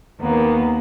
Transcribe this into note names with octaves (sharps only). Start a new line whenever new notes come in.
D#2 A#3 B3